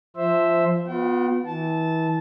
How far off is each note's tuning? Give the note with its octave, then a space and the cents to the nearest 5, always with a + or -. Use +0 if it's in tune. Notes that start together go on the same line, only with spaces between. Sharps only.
F3 -15 C5 +0 E5 +0
B3 +0 F4 +40 G5 -35
E3 -30 A5 -15